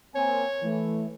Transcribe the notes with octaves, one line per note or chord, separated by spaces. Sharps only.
A#3 C4 C#5 G#5
E3 A3